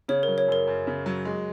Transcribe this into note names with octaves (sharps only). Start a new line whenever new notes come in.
C#3 C#5
F#3 A#4
C#5
F#2 A#4
F#2
C#3
F#3
G#3